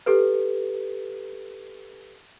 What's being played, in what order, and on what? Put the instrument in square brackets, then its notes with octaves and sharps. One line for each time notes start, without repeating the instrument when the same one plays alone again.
[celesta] G4 A4 B4